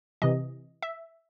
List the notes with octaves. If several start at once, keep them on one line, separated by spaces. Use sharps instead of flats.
C3 E3 D#5
E5